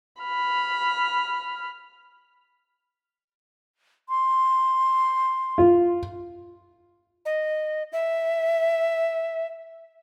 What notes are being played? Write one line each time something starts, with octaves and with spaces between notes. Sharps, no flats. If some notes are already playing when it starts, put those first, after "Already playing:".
B5 F6
C6
F4
D#5
E5